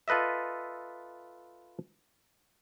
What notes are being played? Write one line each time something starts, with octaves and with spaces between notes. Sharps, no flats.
F4 A4 B4 D#5 E5